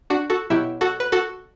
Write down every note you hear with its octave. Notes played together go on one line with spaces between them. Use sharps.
D4 F#4
F#4 A4
B2 F#3 E4 G4
F#4 A4
B4
F#4 A4